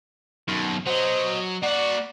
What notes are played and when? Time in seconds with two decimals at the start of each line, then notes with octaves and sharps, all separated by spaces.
0.48 F#2 B2 D#3
0.87 F#3 B3 C5 D#5
1.63 A#3 F#4 D5 F#5